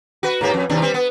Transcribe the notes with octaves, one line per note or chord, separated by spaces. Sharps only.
F#4 B4
G#2 A#3 G4
F2
D#2 C3 D4
G3 C4
B3